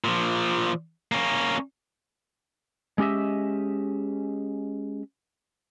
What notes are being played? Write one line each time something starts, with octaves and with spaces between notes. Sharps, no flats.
A#2 F3
A#3 C#4
G#3 C#4 G4 D#5 E5